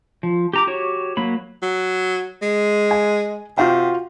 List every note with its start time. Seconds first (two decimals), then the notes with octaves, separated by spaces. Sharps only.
0.23 F3
0.53 G4 A#5 D6
0.67 F#4 G4 C#5
1.17 F#3 A#3 B5
1.63 F#3
2.42 G#3
2.91 G#5
3.58 C3 F4 F#4 G5